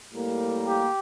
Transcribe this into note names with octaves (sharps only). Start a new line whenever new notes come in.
A2 G3 A#3
G4